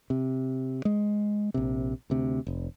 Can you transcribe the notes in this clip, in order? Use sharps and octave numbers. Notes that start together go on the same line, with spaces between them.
C3
G#3
A#1 C3
D2 C3
F1